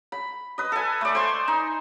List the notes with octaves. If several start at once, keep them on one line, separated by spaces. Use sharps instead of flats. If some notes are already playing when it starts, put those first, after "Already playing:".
B5
B4 D#5
A4 G#5
A3 D5
C5 G#5 C6
D#4